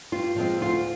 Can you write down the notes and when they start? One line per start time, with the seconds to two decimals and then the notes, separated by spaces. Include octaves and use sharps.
0.12 G2 F4
0.37 F3 G#3 C4
0.61 D2 F4